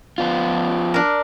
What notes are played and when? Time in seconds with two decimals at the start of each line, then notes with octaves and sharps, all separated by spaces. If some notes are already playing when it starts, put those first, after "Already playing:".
0.18 F3 B3 F4
0.94 D4 A#4